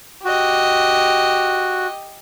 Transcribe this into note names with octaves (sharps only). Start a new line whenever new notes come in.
F#4 G4 D#5